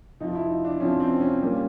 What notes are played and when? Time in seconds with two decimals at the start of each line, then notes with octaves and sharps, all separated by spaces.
0.20 F2 C3 F3 D#4
0.35 E4
0.50 D#4
0.65 D4
0.80 F2 C3 F3 C#4
1.00 C4
1.21 C#4
1.40 A#2 G3 A#3